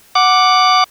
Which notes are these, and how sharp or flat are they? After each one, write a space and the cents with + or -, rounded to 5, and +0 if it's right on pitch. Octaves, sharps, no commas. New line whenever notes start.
F#5 +0 D6 +0